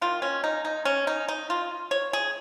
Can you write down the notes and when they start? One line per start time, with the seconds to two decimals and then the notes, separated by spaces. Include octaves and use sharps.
0.01 D#3 A#3 F4
0.22 C#4
0.44 D#4
0.65 D#4
0.85 C#4
1.07 D#4
1.28 D#4
1.50 F4
1.91 C#5
2.13 G#4